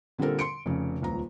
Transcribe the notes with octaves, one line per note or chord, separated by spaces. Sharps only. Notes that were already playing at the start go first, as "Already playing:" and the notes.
A#2 D3 G3 C4 A4 A#4
C6 C#7 D7
F1 C#3
D#1 C#2 A#5